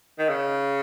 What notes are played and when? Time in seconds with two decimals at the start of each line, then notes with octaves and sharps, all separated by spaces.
0.19 D#3
0.29 C#3